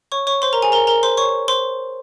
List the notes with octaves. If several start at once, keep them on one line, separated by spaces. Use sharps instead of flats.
C#5 C#6
C#5 C#6
C5 C6
A#4 A#5
G#4 G#5
A#4 A#5
A#4 A#5
C5 C6
C#5 C#6
C5 C6